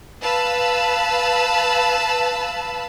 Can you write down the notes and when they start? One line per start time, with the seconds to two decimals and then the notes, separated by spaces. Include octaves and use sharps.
0.22 B4 F5 A5 B5 E6